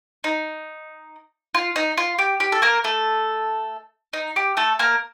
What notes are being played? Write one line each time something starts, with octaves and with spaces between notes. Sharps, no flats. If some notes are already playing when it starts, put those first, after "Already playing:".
D#4
F4
D#4
F4
G4
G4
A4
A#3 A#4
A3 A4
D#4
G4
A3 A4
A#3 A#4